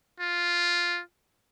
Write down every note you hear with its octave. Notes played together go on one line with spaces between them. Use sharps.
F4